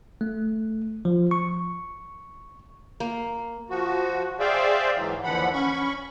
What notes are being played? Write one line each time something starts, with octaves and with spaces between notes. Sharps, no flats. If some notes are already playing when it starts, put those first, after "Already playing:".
A3
F3
C#6
A#3
F3 F#4
G#4 C5 D5 E5 F5 G5
G#2 E3 F#3
D#2 D3 E3 F3 F#5 B5
C#4 B5 C#6